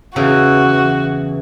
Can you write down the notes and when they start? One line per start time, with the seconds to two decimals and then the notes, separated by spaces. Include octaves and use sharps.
0.16 E2 C#3 E3 F#4